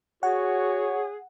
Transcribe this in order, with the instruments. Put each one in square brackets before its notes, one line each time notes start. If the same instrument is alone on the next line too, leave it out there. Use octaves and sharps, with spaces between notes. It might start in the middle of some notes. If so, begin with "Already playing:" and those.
[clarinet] F#4 [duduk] G#4 [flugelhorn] C#5 [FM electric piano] F#5